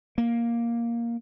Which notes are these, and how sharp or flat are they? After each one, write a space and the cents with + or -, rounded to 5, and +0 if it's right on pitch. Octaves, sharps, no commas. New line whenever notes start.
A#3 +5